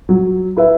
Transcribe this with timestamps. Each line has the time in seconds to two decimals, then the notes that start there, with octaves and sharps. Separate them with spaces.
0.09 F#3
0.57 E4 B4 E5